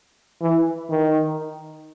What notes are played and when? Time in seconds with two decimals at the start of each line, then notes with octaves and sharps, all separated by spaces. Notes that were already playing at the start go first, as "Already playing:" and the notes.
0.41 E3
0.90 D#3